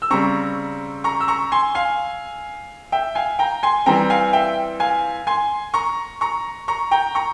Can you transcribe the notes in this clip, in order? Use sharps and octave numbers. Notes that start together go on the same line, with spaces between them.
E6
C#3 G3 C4 A#5 C#6
A#5 C#6
E6
A#5 C#6
G#5 C6
F5 G#5
E5 G5
F5 G#5
G5 A#5
G#5 C6
E3 G3 C4 G5 A#5
F5 G#5
E5 G5
F5 G#5
G#5 C6
A#5 C#6
A#5 C#6
A#5 C#6
G5 A#5
A#5 C#6